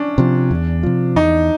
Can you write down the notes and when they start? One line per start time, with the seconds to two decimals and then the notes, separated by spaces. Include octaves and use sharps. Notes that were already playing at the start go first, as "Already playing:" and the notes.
Already playing: C#4 D4
0.18 C3 F3
0.51 E2
0.83 C3 F3
1.16 E2 D#4